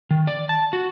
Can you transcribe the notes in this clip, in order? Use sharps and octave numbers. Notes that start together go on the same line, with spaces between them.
D#3
D5
A5
F#4